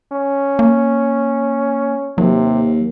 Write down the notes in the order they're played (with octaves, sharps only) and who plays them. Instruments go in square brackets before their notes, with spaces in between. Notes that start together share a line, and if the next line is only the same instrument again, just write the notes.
[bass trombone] C#4
[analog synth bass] A#3
[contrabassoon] D#2 [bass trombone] C3 [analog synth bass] F#3